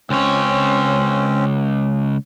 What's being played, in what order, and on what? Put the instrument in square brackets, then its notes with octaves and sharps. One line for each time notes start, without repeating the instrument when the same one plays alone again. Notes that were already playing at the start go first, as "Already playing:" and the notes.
[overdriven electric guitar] C#2 C#5 [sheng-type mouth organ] C4 C#4